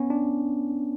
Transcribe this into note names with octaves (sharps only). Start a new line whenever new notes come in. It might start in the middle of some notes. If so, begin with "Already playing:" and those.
Already playing: B3 C#4
D4